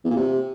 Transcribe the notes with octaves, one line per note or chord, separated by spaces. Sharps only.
E2
A#2
C3